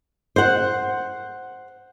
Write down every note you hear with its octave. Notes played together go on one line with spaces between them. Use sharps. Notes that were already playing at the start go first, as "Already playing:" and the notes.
C5 F#5